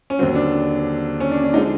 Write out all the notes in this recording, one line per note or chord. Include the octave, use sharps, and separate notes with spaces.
C#4
D#2 D3 F#3 C4
D4
C#4
D4
D4
D3 F3 G#3 D#4